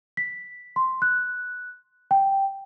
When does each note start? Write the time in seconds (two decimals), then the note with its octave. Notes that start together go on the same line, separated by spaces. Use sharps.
0.17 B6
0.76 C6
1.02 F#6
2.11 G5